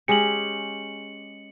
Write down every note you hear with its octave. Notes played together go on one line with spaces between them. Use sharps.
G#3 C#4 G4 C#7 F#7